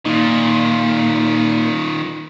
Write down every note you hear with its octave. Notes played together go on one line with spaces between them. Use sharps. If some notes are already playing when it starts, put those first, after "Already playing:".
A#2 D#3 D#4 F4